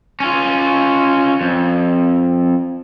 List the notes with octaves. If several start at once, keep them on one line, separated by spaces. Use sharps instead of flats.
C#4 F4
F2